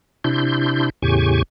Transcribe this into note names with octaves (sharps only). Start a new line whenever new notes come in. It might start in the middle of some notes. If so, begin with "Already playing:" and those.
C3 D4 E4 C6 G6
E2 A2 C#3 G4 G#5 C#6